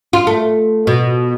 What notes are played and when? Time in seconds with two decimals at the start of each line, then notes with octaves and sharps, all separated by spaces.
0.13 F4
0.27 A3
0.87 B2